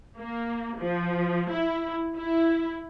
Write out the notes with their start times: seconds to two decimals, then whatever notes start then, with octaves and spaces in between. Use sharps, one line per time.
0.19 A#3
0.78 F3
1.51 E4
2.15 E4